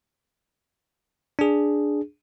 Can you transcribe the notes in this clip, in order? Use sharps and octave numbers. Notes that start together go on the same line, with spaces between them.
D4 G#4